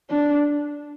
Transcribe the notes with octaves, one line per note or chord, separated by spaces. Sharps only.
D4